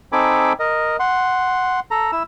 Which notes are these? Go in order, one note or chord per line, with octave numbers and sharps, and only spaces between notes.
C4 D#4 A4 G#5 B5 D6
A#4 D#5
F#5 C6
A4 A#5
E4 E6